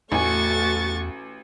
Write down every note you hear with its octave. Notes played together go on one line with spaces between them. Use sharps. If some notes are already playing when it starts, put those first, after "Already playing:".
A1 E2 A3 F#4 G#5 C#6 A6